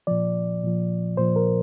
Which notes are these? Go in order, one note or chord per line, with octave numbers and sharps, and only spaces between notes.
A#2 F3 D5
A#2 F3
A#2 F3 C5
A#4